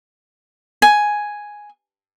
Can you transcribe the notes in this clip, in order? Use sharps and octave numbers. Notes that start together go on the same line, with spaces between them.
G#5